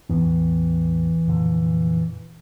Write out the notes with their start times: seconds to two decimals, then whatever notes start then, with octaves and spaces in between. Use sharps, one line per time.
0.09 A1 E2 E3 B3
1.28 F2 A#2 D3